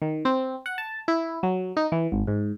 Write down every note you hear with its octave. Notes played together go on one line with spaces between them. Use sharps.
D#3
C4
F#5
A5
E4
F#3
D#4
E3
G#1
G#2